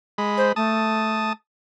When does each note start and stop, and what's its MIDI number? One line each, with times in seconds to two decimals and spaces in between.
0.18 0.52 56
0.18 0.52 83
0.37 0.51 72
0.56 1.31 57
0.56 1.33 81
0.56 1.33 87